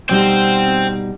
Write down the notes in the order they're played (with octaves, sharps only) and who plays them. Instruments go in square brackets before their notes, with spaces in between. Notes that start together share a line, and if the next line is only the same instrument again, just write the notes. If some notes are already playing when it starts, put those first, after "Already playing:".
[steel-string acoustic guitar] B2 G3 D#4 [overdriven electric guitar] C5 G5